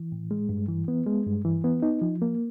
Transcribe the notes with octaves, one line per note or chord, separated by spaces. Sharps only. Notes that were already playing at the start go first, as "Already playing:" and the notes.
Already playing: E3
A2
G#3
G2
E3
B3
G#3
G2
E3
B3
D#4
F3
A#3